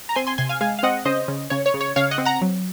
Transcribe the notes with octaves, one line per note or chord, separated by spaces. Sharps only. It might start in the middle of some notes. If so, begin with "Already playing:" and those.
A#5
C4 G#5 C6
G#5 C6
C3 G#5 C6
F5 G#5
G#3 F5 G#5
F5
C4 D#5 F#5
C#3 C5 D#5
C#3
C#3 C#5
C#5
C#3
C#5
C#3 C#5 F5
D#5 F#5
C4
F#5 A#5
F#3